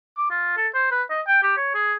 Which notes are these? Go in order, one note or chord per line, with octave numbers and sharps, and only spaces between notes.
D6
F4
A4
C5
B4
D#5
G5
G4
C#5
G#4